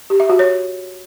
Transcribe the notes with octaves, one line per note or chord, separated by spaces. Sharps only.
G4
E5
F#4
C#5